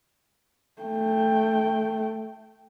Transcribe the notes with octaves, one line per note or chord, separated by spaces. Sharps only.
A3 G5